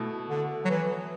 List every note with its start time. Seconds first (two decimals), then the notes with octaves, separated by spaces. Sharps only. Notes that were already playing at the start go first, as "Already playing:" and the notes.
Already playing: B2 A3 E4
0.29 D3
0.65 F#3
0.70 E3